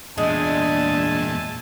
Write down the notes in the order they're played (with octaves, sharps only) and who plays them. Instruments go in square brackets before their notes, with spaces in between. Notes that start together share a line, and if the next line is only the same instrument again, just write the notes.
[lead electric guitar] E2 A#2 [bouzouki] G#3 [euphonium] D4 [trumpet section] E5 G#5 A5